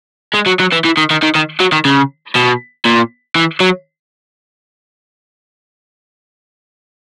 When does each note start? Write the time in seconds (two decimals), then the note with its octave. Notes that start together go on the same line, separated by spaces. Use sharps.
0.35 G#3
0.47 F#3
0.60 F#3
0.73 E3
0.85 E3
0.97 D#3
1.11 D#3
1.23 D#3
1.35 D#3
1.60 F#3
1.72 D#3
1.85 C#3
2.35 B2
2.85 A#2
3.36 E3
3.60 F#3